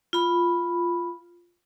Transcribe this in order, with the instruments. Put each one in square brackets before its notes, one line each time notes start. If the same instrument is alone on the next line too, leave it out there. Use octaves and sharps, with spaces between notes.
[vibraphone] F4 B5